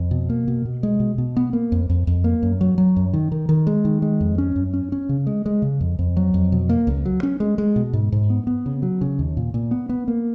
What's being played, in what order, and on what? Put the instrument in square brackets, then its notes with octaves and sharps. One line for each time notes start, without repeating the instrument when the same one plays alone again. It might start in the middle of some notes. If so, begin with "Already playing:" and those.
Already playing: [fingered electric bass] F2
B2
A#3
B2
B2
G#3
B2
B2
B3
A#3
F2
F2
F2
A#3
F#2
F#3
F#3
F#2
D#3
D#3
D#3
G#3
D#3
G#3
F2
C#4
F#2
C#4
C#4
C#3
G#3
G#3
C#3
F2
F2
F#3
F2
B2
A#3
C#2
F#3
C#4
G#3
G#3
B2
G#2
G#2
B3
B3
C#3
F#3
C#3
D#2
A#2
A#2
B3
B3
A#3